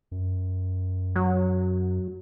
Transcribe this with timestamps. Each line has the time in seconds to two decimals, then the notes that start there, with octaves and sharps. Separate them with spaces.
0.11 F#2
1.16 F#3